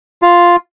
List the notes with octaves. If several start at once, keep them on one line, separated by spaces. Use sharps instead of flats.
F4